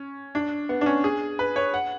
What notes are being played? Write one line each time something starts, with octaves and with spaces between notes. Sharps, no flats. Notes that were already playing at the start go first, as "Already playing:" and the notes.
Already playing: C#4
D4
B3
D4
C#4
G#4
B4
C#5
F#5